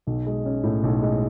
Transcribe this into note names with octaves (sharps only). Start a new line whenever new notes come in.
B1
G#3
C#4
A2
B1
G#3